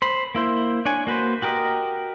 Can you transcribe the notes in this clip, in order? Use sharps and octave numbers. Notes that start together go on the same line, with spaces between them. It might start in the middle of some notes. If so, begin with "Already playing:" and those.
C5 B5
A#3 E4 C5
D4 C#5 G#5
A#3 F#4 B4 C5
F#4 G4 A#4 D#5